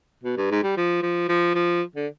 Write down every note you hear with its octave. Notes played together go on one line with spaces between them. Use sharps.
B2
G2
G#2
G3
F3
F3
F3
F3
D3